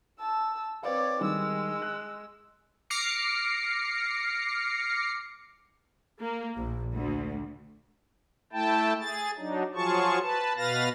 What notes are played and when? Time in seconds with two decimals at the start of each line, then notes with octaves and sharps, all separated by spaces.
0.20 A5 E6
0.83 C4 B4 C#5 D5 F5
1.21 D#3 G3 G#3 E6
1.82 F#6
2.90 D6 F6 A#6 C7 C#7
6.20 A#3
6.57 A#1
6.95 D2
8.53 A3 E4 G5 A5
9.00 G#4 A6
9.38 F#3 D4 D#4
9.75 F3 F#3 F4 G#4 A5 C#6
10.22 B4 A5
10.57 B2 B4 F5 A6 A#6